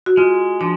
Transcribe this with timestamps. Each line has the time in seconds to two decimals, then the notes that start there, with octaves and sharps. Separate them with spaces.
0.06 F#4
0.17 G#3 F4
0.61 F3 D4